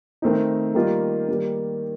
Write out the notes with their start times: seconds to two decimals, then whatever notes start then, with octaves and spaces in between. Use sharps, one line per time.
0.22 D#3 A3 C4 D#4
0.75 D#3 G3 A#3 F4
1.29 D#3 G3 A#3